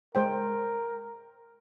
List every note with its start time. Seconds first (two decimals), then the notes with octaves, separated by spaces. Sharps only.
0.15 G#3 A#4 C5 G5